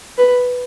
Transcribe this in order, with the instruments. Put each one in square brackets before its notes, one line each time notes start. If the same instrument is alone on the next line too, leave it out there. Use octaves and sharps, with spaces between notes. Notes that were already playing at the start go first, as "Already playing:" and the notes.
[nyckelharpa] B4